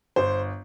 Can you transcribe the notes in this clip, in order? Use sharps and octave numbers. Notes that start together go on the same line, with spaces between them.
G1 C5